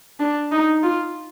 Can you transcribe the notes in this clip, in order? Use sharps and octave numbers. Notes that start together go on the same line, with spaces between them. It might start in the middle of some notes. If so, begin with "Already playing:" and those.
D4
D#4
F4